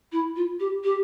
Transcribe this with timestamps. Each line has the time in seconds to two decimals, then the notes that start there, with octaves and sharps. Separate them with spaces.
0.12 E4
0.36 F4
0.60 G4
0.84 G4